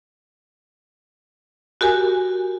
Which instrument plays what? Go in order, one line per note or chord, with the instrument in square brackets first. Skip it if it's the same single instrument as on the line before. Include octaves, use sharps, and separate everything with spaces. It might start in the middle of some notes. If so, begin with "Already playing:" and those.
[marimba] F#4 G4 A#4 G#5